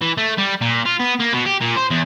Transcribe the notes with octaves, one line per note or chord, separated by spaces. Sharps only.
E3
A3
G3
A#2
F4
B3
A#3
B2
G4
A#2
C5
E2